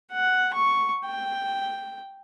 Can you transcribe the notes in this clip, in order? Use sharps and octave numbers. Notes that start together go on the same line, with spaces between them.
F#5
C#6
G5